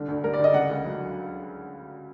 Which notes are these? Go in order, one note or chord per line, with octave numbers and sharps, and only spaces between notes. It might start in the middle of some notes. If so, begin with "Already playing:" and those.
Already playing: C2 D3
D2
G3 A#4
D5
D2 D#5
C#3 F#5
C#2
F#3